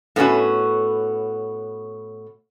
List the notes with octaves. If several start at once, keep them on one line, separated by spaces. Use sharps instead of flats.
A2 B3 C#4 F#4